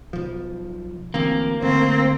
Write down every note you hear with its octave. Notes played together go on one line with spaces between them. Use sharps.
B1 F3
D2 E3 A#3 C4
D3 A3 C4